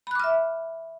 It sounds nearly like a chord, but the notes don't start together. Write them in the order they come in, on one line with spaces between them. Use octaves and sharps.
B5 F#6 D6 F6 E5